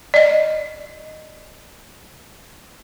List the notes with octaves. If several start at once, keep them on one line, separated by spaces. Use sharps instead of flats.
D5 D#5